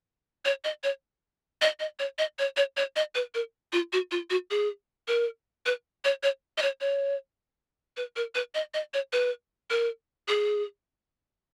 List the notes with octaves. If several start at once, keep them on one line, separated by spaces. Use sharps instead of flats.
C#5
D#5
C#5
D#5
D#5
C#5
D#5
C#5
C#5
C#5
D#5
B4
A#4
F4
F#4
F4
F#4
G#4
A#4
B4
C#5
C#5
D#5
C#5
C#5
B4
A#4
B4
D#5
D#5
C#5
B4
A#4
G#4